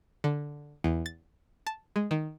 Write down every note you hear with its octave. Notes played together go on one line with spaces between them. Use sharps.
D3
E2
A6
A5
G#3
D#3